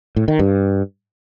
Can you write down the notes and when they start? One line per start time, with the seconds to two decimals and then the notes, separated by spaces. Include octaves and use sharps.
0.16 A2
0.28 D#3
0.39 G2